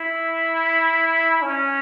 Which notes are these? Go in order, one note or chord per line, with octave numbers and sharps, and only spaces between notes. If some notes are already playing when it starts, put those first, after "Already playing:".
Already playing: E4
C#4